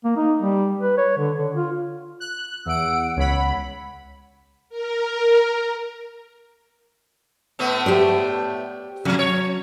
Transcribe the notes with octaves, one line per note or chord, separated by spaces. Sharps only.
A#3
D#4
G3
B4
C#5
D3
D3
F4
F#6
E2 F#5 E6 D7
C#2 C#5 F#5 B5
A#4
A2 A3 B3
G4 C5 D5
C3 F#3 C#4
C#5